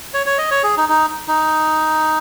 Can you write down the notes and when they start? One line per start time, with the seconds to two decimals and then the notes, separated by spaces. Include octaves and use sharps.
0.14 C#5
0.26 C#5
0.38 D#5
0.51 C#5
0.64 G#4
0.77 D#4
0.89 D#4
1.28 D#4